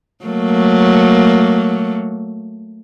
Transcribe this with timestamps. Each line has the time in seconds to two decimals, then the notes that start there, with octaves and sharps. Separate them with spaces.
0.25 F#3 A3 A#3